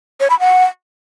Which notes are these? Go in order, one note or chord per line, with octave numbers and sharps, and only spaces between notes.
C#5
B5
F#5